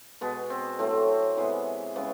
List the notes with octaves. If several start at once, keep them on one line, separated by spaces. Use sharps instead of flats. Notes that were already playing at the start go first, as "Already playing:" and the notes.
B2 G#3 B3
C4
A2 F#3 A3 C4
C3 E3 G#3 B3
C#3 E3 G#3 B3